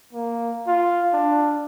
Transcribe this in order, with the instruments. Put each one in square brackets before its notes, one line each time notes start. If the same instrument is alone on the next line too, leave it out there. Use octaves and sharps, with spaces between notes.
[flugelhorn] A#3
F4
D4